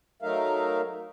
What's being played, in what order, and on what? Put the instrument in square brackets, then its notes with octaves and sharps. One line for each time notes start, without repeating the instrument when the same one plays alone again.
[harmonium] F#3 A3 D#4 A#4 E5 F5